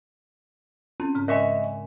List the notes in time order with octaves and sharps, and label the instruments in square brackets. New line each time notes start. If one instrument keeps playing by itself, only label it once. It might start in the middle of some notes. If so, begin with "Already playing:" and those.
[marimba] C4 A4 [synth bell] C#4
[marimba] G#2 C#3 A#5
[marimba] G#3 [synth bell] A#4 G#5 [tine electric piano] D#5 E5 C#6